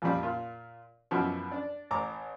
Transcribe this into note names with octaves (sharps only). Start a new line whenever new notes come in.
A#1 F2 A#2 F3 G3
A#2 F4
F#2 B2 E3 F3
D4 D5
A1 A#5 D6